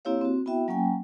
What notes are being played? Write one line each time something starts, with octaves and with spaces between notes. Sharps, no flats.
A#3 C4 E4 G4 C#5 F5
C4 F#4
B3 E4 F#4 E5 G5
F#3 A#3 C#4 G5 G#5